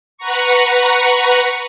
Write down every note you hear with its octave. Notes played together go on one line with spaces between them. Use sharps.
B4 F#5 A#5 C#6